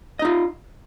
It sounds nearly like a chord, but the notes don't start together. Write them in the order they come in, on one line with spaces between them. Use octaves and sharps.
D#5 D#4 F4